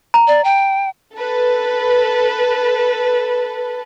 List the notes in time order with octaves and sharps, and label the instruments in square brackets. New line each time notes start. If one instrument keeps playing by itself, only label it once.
[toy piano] A#5
[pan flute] D5
G5
[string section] A4 B4